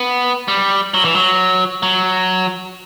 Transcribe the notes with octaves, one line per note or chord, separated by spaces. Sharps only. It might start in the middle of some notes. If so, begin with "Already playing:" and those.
Already playing: B3
G3
F#3
E3
F#3
F#3